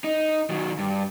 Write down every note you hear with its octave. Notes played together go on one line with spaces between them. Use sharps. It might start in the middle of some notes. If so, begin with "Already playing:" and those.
D#4
D#3 F#3
G2